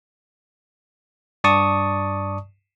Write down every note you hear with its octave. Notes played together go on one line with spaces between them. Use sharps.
G2 D5 A5 C#6 D#6